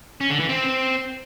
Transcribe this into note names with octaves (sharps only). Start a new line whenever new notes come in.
C#4
D3
E3
C4